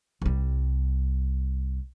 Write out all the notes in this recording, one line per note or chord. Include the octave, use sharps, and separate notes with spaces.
C2 G3